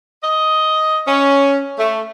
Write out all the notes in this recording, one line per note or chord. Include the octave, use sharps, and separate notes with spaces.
D#5
C#4
A3